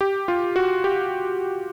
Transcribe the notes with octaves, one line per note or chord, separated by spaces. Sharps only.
G4
F4
F#4
G4